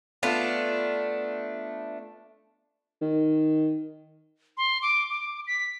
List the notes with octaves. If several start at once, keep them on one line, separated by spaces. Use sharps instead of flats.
A3 B3 D4 F4
D#3
C6
D6
D6
B6